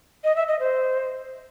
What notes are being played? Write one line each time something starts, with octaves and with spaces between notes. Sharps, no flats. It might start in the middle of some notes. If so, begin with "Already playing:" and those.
D#5
E5
D#5
C5